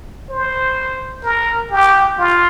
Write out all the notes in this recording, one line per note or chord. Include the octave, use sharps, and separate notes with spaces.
C5
A#4
G4
F4